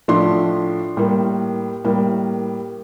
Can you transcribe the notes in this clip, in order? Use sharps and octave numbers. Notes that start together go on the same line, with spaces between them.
A2 F3 A3 D4 C6
A2 G3 A#3
A2 G3 A#3